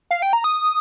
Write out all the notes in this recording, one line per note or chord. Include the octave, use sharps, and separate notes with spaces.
F5
G5
A#5
D#6